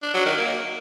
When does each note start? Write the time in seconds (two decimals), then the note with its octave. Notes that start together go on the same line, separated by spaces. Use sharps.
0.02 D4
0.14 F#3
0.25 D#3
0.37 A#3